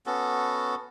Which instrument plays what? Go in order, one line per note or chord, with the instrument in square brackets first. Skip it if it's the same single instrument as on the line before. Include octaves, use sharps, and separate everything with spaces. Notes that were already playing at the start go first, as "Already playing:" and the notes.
[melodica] B3 C#4 F#4 A4